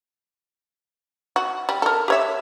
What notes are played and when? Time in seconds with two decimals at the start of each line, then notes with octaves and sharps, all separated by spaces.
1.36 F#4
1.69 G3
1.82 A4 A#4
2.08 G4 C#5 E5